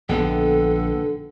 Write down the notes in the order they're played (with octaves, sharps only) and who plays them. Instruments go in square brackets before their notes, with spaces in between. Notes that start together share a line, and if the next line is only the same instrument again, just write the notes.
[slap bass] A#1 [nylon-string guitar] D3 B3 G5 [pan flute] A4